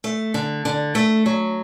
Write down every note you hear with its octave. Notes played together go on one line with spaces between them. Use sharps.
A3
D3
D3
A3
F#3